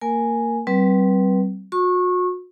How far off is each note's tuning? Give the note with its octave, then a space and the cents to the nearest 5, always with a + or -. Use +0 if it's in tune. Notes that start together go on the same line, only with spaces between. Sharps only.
A#3 -25 A#4 +0 G#5 +0
G3 -35 C4 +0 B4 -25
F#4 -40 C#6 -25